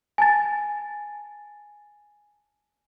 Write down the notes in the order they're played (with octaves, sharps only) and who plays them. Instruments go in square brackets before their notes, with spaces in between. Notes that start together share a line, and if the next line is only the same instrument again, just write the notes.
[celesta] G#5 A5 A6